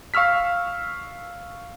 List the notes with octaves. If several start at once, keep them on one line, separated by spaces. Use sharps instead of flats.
F5 C#6 E6 F6 B6